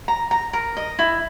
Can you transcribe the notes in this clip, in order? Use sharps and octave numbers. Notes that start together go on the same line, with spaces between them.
A#5
A#5
A#4
D#5
E4